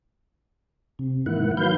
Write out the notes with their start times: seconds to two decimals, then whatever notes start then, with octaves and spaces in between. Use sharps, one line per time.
0.99 C3
1.26 G#2 D#3 E3 A#3 E4 F#5
1.57 D#3 F#3 B4 F5 G6